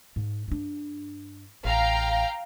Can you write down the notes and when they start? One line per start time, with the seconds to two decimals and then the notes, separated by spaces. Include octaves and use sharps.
0.16 G#2
0.48 G2 D4
1.65 A1 F5 G5 A#5